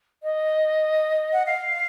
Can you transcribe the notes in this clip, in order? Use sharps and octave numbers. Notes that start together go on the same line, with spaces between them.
D#5
F#5
F5